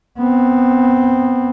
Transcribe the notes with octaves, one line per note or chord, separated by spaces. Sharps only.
B3 C4